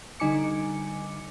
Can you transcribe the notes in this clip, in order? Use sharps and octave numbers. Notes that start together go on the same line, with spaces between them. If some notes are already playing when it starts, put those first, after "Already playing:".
D3 G3 D#4 G#5 D6 C#7